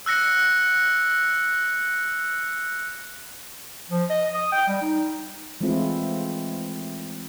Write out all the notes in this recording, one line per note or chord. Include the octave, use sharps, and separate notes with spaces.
E6 F#6 A#6 C#7
F3
D#5
D#6
G5
G3
D#4
E3 G#3 A3 C4 E4 F4